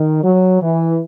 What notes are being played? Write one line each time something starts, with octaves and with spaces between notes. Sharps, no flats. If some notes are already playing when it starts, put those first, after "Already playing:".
Already playing: D#3
F#3
E3